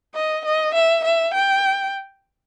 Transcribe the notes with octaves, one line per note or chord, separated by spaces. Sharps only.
D#5
D#5
E5
E5
G5